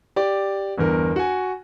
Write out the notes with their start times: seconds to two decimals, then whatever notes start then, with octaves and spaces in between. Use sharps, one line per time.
0.16 G4 D5
0.78 G1 E2 A#4
1.16 F#4 G#5